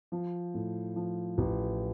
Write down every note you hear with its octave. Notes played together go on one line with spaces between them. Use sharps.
F3
A2
F3
A1